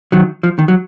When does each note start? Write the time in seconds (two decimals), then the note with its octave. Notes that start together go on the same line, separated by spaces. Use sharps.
0.12 D#3 F#3
0.43 F3
0.59 D#3
0.68 F#3